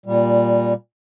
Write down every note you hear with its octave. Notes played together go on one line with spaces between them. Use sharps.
A#2 G3